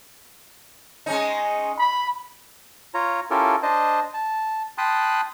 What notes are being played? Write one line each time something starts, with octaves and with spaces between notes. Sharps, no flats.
G#3 C#4 D#4
B5
F4 C#5 A#5
C#4 E4 F4 G4 A4 A#4
D4 C5 D#5 A5
A5
G5 A5 B5 C6 D#6 F#6